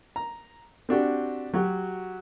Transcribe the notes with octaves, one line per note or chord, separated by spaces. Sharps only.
A#5
C4 D4 F#4 G4
F#3 F#4 G4